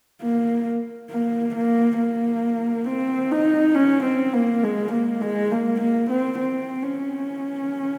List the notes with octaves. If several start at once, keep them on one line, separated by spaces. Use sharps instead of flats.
A#3
A#3
A#3
A#3
C4
D#4
C#4
C4
A#3
G#3
A#3
G#3
A#3
A#3
C4
C4
C#4